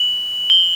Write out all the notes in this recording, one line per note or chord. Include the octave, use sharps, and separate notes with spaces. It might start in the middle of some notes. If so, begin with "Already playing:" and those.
Already playing: F#7
G7